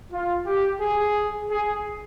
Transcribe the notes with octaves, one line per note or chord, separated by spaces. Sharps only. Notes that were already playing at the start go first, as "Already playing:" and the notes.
F4
G4
G#4
G#4